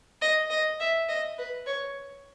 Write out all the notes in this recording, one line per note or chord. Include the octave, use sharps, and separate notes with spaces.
D#5
D#5
E5
D#5
B4
C#5